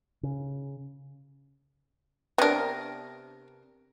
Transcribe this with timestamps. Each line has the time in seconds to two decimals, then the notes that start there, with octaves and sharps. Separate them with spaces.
0.23 C#3
2.38 C3 B3 D4 A#4